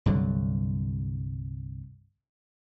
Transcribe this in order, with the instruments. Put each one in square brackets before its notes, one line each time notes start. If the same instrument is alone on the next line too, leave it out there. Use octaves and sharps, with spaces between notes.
[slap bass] C2 G2 D3 F#3